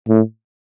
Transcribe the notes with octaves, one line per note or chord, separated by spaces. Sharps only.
A2